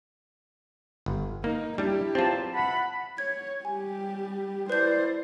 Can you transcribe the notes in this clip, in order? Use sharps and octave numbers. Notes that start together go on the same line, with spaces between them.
G1
A#3 D#4
G3 D4 E4 G4
E2 F#3 C4 F4 A5
E4 F#5 A5 B5
C#5 G#6
G3 G4 G#5
E4 B4 C5 D5 G6